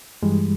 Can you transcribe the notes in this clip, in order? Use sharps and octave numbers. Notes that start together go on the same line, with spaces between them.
G2 E3 G3 G#3